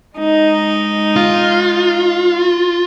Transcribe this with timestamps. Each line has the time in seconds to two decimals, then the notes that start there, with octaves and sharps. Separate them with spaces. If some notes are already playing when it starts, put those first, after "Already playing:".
0.16 G#3 D#4
1.16 F4